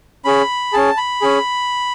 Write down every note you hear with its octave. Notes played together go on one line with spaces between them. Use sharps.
C#4 G#4 B5
C#4 G#4 A5
B5
C#4 G#4